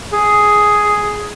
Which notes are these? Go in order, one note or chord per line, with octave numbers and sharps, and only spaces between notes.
G#4